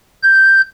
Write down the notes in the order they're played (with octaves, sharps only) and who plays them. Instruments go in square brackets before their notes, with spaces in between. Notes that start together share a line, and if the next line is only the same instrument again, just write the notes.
[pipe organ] G6